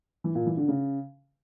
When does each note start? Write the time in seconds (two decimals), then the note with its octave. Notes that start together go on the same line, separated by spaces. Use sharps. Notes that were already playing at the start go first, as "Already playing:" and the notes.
0.24 E3
0.35 A#2
0.46 E3
0.57 D3
0.68 C#3